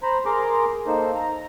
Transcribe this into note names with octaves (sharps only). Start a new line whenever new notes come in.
C5 A#5 B5
G#4 A#4 A#5 C6 D6
A#3 D#4 A4 C5
A#5